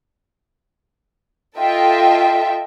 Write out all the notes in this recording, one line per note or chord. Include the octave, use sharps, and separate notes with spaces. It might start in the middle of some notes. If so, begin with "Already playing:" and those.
F4 A4 D#5 E5 G5